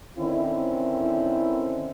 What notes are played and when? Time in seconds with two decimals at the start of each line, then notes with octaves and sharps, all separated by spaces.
0.17 D3 D#3 C4 C#4 E4